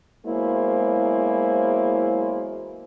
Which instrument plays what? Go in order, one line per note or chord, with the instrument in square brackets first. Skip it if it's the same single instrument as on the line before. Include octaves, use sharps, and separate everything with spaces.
[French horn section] E2 F#3 G#3 A#3 E4 C5